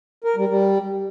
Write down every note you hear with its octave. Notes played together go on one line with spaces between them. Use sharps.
A#4
G3
G3